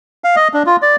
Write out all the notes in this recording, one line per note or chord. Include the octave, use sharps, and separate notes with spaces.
F5
D#5
D4
F4
D5